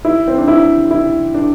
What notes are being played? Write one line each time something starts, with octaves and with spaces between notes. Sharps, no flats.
E4
C4
D4
E4
E4
D4